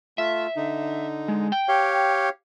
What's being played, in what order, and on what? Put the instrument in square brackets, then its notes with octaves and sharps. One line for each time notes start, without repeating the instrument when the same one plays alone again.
[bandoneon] A3 F4 [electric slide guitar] E5
[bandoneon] D3 D#4
[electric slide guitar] G#3
G5
[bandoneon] G4 C#5 F5